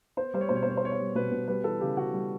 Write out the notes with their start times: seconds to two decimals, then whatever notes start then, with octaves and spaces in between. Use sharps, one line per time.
0.17 B3 C5
0.34 G3 C5
0.41 C#5
0.49 B2 C5
0.56 C#5
0.63 C5
0.66 B2 C#5
0.77 C5
0.83 B3 C#5
0.92 C5
0.99 G3
1.15 B2 B4
1.32 B2
1.48 G3 B4
1.64 E3 A4
1.81 C#3 G4
1.97 C#3 F#4
2.14 G3